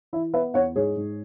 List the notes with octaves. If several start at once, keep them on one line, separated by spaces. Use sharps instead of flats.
E3 E4
B3 B4 E5
E2 C#5 F#5
G#2 G#4 C#5
G#2